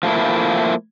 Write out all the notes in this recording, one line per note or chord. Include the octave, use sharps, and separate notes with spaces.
F3 A3 A#3 E4